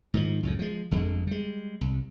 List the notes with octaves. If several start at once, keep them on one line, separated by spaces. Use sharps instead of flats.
G#2 D#3 F3
C#2 F#2 A2
F3 G#3
G1 F2 D3 G#3
G3 G#3
C2